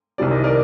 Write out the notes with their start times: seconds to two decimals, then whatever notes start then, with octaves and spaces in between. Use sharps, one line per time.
0.18 C2 C3 D#3 G3 D5
0.31 D#5
0.44 A#4 D5